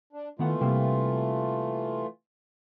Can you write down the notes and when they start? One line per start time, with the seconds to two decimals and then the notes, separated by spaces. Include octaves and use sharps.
0.13 D4
0.39 D#3 E3 A3 B3 F4 F#5
0.61 C3 G3 A#3